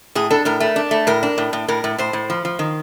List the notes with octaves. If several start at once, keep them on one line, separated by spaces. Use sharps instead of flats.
A2 G#4
D4 A4
A2 A#4
A3
D4
A3
A2 A#4
D4
A2
A2
A2 A#4
A2
A2 C5
A2
F3
F3
D#3